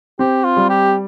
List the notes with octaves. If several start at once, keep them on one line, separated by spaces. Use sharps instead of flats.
C4 G4
F4
G3
G4